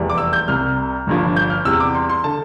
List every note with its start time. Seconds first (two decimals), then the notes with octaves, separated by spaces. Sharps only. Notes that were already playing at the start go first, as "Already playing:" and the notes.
Already playing: F1 E2 E3 G3
0.10 D6
0.18 E6
0.33 G6
0.48 C2 C3 G3 F6
1.07 G1 G2 F3
1.36 G6
1.50 F6
1.65 E2 C3 G3 E6
1.80 D6
1.94 C6
2.09 C6
2.24 D3 A5